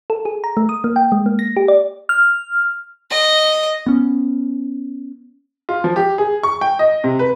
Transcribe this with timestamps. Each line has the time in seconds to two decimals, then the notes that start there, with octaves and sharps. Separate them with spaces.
0.10 A4
0.25 G#4
0.44 A#5
0.57 A3
0.69 D#6
0.84 A#3
0.96 G5
1.12 G#3
1.26 A#3
1.39 A#6
1.56 G4
1.68 D5
2.09 F6
3.10 D#5
3.86 B3 C#4
5.69 F4
5.84 F3
5.96 G4
6.18 G#4
6.43 C#6
6.61 G5
6.79 D#5
7.04 C3
7.19 B4